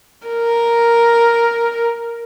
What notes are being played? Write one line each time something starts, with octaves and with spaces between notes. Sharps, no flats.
A#4